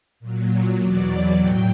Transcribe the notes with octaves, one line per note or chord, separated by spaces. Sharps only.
A#2 F#3
E2 B2 F#3 D5
A2 F#3 G5